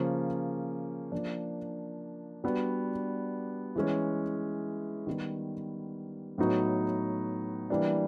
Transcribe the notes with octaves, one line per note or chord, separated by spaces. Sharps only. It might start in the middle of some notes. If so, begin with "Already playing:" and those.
Already playing: C#3 F3 A#3 C#4
F3 A#3 D4
G3 B3 D4 F#4
E3 G#3 C#4
D#3 G3 B3
A2 F#3 B3 D#4 F#4
E3 G3 A#3 D4